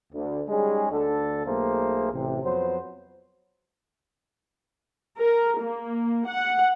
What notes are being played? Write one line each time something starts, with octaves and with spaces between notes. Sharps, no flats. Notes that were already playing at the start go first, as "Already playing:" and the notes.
D2
G3 G#3 C#4 D#4 G#4
D2 D3 A4
B1 A3 A#3 G#4 C5
A1 C3
F2 F#3 B3 C5
A#4
A#3
F#5